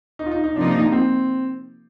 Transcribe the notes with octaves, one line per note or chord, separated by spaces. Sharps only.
D#4
F4
D#4
D#4
C3 F3 A#3 D4 D#4
C4